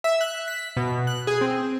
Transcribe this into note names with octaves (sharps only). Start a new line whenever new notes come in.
E5
F#6
B6
B2
F#6
G#4
C4